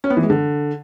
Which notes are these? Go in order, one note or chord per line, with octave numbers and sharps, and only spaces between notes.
C#4
B3
E3
G#3
D3